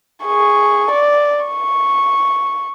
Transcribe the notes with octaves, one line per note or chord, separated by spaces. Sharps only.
G#4 C#6
D5
C#6